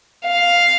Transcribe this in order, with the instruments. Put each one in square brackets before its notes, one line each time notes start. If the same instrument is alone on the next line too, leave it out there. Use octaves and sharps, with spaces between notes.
[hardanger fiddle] F5